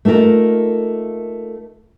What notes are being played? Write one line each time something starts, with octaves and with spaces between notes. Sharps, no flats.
A3 A#3 D#4 F4 A#4